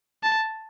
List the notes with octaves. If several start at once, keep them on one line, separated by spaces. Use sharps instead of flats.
A5